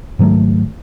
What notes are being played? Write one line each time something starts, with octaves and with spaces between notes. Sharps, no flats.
G#2 D#3 F#3 A3